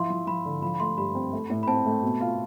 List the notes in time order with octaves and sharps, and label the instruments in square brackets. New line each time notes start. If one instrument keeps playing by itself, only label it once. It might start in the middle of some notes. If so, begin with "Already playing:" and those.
Already playing: [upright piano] F3 E4 [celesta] C6
[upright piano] F3
[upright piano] F3 [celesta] B5
[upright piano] D3
[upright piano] F3 [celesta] B5
[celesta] B5
[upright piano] A3 [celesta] C6
[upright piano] G2 [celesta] B5
[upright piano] C4
A3
A2
[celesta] B5
[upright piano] C4 [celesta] A5
[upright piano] A3
B2
F4